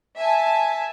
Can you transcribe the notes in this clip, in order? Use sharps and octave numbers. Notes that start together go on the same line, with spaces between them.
E5 G#5 A5